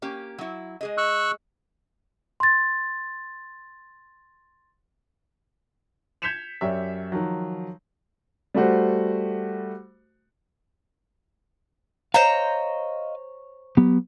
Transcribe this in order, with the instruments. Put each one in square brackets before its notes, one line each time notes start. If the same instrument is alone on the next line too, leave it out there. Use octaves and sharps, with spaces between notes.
[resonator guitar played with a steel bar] A#3 C#4 G4
F#3 E4
G#3 G#4 D#5
[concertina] C#6 E6 F#6
[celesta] C6 A6
[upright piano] G6 G#6 B6 C#7 E7 F7
F#2 G4 C#5 D5 E5
D#3 F3 F#3
[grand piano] G3 A3 F#4 C5
[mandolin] C5 C#5 A#5 [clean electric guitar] D#5 F5
[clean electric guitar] F#3 B3 G4